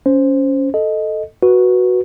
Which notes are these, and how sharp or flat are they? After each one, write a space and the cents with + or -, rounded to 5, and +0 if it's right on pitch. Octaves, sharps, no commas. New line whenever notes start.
C#4 +5 C5 +0
A4 +0 D#5 +0
F#4 +0 B4 -15